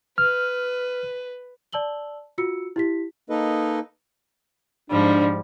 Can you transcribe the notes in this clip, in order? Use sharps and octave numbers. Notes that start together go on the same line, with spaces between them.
B4 F6
D5 A5 E6 F#7 G7
F4 F#4 E6 C#7
E4 G4 B6
A#3 D#4 A4 B4 D#5
G#2 F3 G3 D4